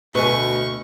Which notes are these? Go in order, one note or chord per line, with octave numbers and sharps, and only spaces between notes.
D2 B2 B4 G#5 C#6